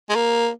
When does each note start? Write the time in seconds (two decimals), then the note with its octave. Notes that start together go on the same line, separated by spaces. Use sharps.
0.10 G#3
0.15 A#3